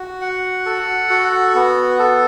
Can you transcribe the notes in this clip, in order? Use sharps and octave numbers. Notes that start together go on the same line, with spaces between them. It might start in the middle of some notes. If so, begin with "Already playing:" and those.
Already playing: F#4
F#5
A4
F#4
B3
A4